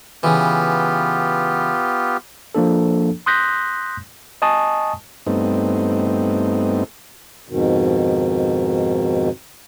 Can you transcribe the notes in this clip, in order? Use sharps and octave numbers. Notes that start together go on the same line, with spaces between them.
C#3 E3 B3 F4 G4
F3 A#3 D4 A4
C6 D#6 F#6 G6 A#6 B6
D#5 G#5 A5 C#6 D#6
G2 A3 B3 C4 D#4
F2 G#2 B2 D#3